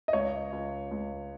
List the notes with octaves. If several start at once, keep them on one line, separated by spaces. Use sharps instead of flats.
D#5
C#2 C#5
C#2
C#2